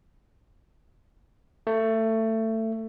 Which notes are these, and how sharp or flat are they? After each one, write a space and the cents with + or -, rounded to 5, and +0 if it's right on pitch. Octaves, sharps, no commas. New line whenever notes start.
A3 +20